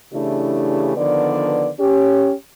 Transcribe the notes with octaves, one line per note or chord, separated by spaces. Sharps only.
C#3 E3 A3 D4 E4 G4
D3 D#3 F3 B3 B4 D5
C#4 G4